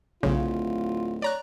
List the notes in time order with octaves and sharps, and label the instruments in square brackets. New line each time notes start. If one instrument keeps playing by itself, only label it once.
[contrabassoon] D1 [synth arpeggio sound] B1 C#3 [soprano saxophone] F4
[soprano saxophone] C#5 [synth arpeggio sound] D5 A#5 F#6